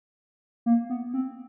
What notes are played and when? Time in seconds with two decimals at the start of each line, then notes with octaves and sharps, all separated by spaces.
0.66 A#3
0.90 B3
1.14 C4